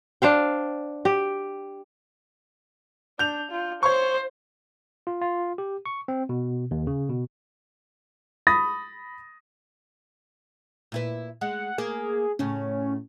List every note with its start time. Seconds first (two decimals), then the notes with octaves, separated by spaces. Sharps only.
0.22 D4 C5 F5 G5
1.05 G4
3.19 D4 G6 F7
3.51 F4
3.83 C5 C#5 C6 C#6
5.07 F4
5.21 F4
5.58 G4
5.86 C#6
6.08 C4
6.29 B2
6.71 D#2
6.87 C#3
7.09 B2
8.47 B5 D#6 A6 A#6
10.92 A#2 E4 B4
11.41 G#3 F#5
11.78 A#3 G#4
12.39 A2 C#3 C#4